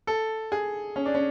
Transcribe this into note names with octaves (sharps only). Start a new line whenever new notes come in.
A4
G#4
C#4
D4
C#4